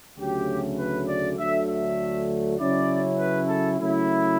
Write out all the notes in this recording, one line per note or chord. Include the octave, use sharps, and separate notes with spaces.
D2 C#3 F#3 A3 G4
B4
D5
D2 D3 F#3 A3 E5
E5
C#3 F#3 C#4 E4 D5
B4
A4
C#3 F#3 A3 E4